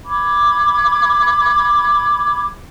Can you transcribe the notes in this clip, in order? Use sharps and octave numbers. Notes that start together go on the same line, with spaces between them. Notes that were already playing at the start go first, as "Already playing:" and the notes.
B5 D6 G#6